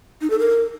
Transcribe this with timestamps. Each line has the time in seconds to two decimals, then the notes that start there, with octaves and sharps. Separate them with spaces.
0.21 D#4
0.30 A4
0.39 A#4